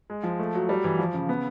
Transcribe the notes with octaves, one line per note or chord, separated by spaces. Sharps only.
G#3
F3
A3
F#3
G3
E3
F3
C#3
B3